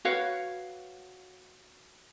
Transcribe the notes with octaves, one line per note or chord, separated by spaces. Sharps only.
F#4 B4 C#5 F5